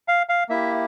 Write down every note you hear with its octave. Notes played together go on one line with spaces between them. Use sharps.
F5
F5
A#3 E4 G4 E5